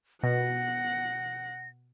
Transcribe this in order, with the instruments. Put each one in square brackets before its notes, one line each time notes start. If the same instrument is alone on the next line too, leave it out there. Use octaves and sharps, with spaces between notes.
[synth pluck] B2 [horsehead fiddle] F#5 [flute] A#6